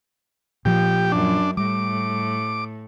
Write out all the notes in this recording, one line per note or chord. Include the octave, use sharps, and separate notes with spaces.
A#2 F3 G4
F#2 D4
A2 G3 D6